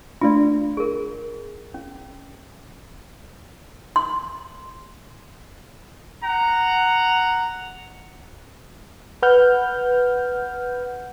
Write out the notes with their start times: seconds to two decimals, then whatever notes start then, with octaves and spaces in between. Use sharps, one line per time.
0.22 A3 D4 F4 D5
0.77 G#4 A#4
1.74 C#4
3.96 C6
6.23 F#5 A#5
9.22 B4 F#5 F6 G6